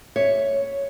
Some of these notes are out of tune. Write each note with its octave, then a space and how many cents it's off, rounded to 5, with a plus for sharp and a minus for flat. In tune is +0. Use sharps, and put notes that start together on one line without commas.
C#5 +0 E5 +0